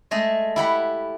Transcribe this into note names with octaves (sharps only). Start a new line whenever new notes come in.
G#3 A3 D#5
E4 G4 F#5 B5